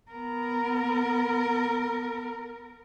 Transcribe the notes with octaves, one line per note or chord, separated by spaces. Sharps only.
B3 A#4